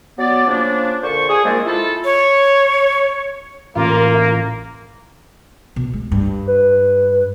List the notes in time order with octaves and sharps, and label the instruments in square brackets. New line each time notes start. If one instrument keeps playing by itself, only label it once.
[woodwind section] F#3 B3 D5
C#3 F3 A#3 D4
A#2 D3 C5 C#6
G#4
D#3 F3 G#3 A#3 C4 D4
E4 F4 A4
[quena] C#5
[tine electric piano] A1 [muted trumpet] A#3 [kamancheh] F4 A#4
[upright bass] B2
G#3
G2
[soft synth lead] B4